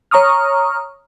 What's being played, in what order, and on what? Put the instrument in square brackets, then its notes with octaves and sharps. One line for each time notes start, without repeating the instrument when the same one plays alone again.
[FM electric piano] C#5 A#5 C#6 D#6 F6